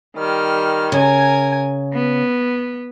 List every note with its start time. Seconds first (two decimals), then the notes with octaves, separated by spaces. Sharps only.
0.16 D#3 G3 F6
0.92 C#3 A#4 G#5 G#6
1.94 B3